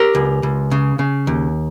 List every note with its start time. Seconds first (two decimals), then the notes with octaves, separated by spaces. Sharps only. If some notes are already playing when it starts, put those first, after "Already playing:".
Already playing: G4 A#4
0.15 C#2
0.43 C#2
0.71 C#3
0.99 C#3
1.27 D#2